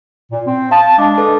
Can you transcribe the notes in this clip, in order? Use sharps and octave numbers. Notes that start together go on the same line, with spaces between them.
A#2
C4
F5 A5 D#6
G#3 D4 D6
A4 B4 A5